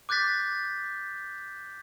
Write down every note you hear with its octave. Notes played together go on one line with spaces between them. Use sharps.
D6 F#6 G6 A6 B6